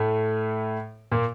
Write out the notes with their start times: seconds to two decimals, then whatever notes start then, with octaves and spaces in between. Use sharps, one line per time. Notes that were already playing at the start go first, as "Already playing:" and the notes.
Already playing: A2 A3
1.12 A#2 A#3